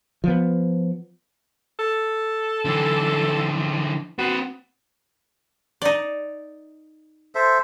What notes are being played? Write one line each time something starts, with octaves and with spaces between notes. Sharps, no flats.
F3 B3
A4
D3 E3
C4 F#4 B4
D#4 D5
A4 C5 E5